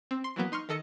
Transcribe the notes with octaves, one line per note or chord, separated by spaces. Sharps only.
C4
C6
E3 F#3 A#3 B3
D#4 C6 C#6 F6
D#3 A4 D#5 C#7